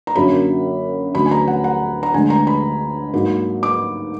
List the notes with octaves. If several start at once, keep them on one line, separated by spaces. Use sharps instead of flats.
A#5
F#2 D3 F#3 A#3 B5
D2 D3 F#3 B5
G#5
A#5
F#5
F#5
A#5
D2 D3 G#3 G#5
A#5
B5
G#2 F#3 A#3
D6